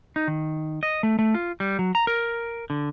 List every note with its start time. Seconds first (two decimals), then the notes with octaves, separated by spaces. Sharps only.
0.16 D#4
0.28 D#3
0.83 D#5
1.03 A3
1.19 A3
1.34 F4
1.60 G3
1.79 F#3
1.95 A#5
2.07 A#4
2.70 D3